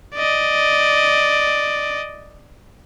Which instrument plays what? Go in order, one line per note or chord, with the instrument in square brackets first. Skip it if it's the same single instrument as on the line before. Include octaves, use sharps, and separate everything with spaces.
[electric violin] D5 D#5